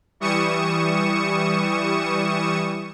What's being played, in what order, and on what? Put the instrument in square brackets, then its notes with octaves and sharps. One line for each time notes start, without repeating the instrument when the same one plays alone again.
[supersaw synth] E3 G3 C#6 D#6 C#7 E7